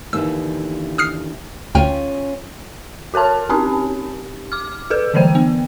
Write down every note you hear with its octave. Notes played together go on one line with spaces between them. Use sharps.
D#2 D3 E3 E6
D#6 F6 C7
D2 C#4 F4 G5 G#5 F6
F#4 A#4 C#5 A5 F6
C4 C#4 D#4 G4
D6 F6
G#4 A4 B4
D3 E3 F#3 C5 G5
B3